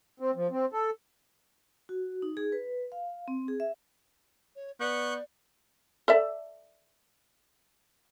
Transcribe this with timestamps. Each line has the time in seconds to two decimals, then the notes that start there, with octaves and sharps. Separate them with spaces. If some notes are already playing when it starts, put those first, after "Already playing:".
0.20 C4
0.35 F3
0.51 C4
0.73 A4
1.89 F#4
2.22 D#4
2.37 G#4
2.52 B4
2.92 F5
3.28 C4
3.48 G#4
3.60 E5
4.56 C#5
4.80 B3 D5 C#6 F#6 G6
6.08 A4 D5 E5